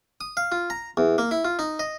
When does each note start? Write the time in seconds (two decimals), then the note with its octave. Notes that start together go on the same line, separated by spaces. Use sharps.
0.21 D#6
0.37 F5
0.52 F4
0.70 A#5
0.97 E2
1.18 A#3
1.31 E4
1.45 F4
1.59 D#4
1.79 D#5